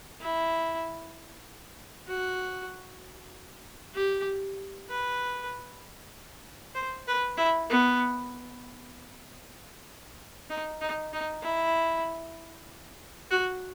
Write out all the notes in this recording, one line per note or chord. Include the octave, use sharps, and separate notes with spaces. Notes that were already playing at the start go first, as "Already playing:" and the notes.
E4
F#4
G4
B4
C5
B4
E4
B3
D#4
D#4
D#4
E4
F#4